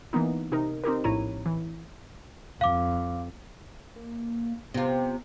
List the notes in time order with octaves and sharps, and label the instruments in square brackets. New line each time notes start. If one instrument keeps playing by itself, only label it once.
[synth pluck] E3 A#3 B3 D#4
C3 D#4 A#4
C4 D#4 G4 A#4
A#1 A2 E4 C#5 A#5 D#7
E3
[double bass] F2 [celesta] F5 D6
[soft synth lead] A#3
[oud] C3 F4 [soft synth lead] B3